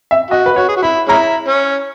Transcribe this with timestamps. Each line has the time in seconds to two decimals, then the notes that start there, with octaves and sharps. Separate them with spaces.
0.11 E5
0.30 F#4 D#5
0.46 B4
0.56 F#4 C#5
0.68 G#4
0.76 F#4
0.83 E4 B5
1.08 G#3 C#4 E4 A#5
1.48 C#4